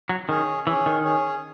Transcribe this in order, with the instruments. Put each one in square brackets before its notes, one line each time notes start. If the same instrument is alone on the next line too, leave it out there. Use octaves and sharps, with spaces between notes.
[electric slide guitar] F#3
[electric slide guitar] D#3 [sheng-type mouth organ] C#4 G#4 C#5
[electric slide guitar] E3 [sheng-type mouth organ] C#4 G#4 C#5
[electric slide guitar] D#3
[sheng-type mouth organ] C#4 G#4 C#5